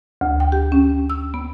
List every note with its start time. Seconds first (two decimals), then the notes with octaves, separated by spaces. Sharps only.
0.21 D2
0.40 G5
0.52 G4
0.72 C#4
1.10 E6
1.34 B3